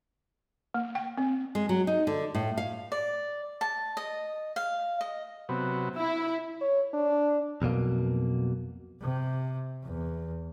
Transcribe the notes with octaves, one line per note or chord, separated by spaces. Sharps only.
A#3
G5
C4
G#3
F#3
D#4
D3
A2
F5
D5
A5
D#5
F5
D#5
C3 F#3 B3
E4 E5
C#5
D4
B1 F2 B2 A#3
C3
E2